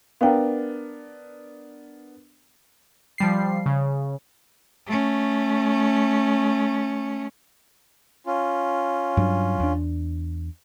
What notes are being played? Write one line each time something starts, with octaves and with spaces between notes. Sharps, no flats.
B3 D4 A#4 F5 G5
F3 G3 C7
C#3
A3 C#4
C#4 F4
G2 F#3 D4
E2 D4